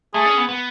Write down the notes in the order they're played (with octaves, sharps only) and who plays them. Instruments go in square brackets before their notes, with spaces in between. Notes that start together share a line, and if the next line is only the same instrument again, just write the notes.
[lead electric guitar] A3 [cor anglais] G#4
[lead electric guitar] C#4
B3
B3